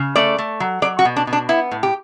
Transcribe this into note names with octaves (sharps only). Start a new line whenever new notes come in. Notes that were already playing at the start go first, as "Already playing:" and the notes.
Already playing: C#3
A3 D5
A3
F#3
F#3 D5
F#4
B2
D4
B2
D4
B3 E4
A2
G4